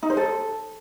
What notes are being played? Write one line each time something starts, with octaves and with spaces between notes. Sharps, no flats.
D#4
C5
A4